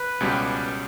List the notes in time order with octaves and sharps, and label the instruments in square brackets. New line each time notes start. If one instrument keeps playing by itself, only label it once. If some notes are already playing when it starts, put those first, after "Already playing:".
Already playing: [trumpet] B4
[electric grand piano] C#2 B2 G3 C#4 G4